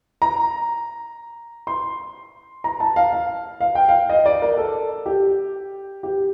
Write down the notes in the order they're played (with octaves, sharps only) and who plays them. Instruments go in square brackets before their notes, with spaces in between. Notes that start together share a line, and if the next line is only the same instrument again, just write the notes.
[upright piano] A#5
C6
A#5
A5
F5
F5
F5
G5
F5
D#5
D5
A#4
A4
G4
G4